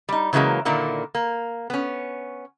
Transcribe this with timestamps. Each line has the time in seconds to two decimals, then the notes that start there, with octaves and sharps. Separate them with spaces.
0.09 G3 D#4
0.33 C#3 E3 F#3 G#3 A#3
0.65 A#2 D3 D#3 A#3 E4
1.15 A#3
1.70 B3 C#4